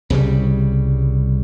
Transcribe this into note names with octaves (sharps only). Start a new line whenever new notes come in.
C2 C#3 F3 G3